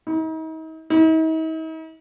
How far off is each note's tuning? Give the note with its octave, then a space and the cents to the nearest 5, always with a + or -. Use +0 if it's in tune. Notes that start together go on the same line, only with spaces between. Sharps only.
D#4 +40
D#4 +45